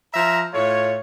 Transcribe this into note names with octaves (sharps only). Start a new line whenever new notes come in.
F3 E5 A#5
A2 A3 F4 C#5